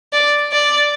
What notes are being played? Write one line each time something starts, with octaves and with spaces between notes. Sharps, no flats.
D5
D5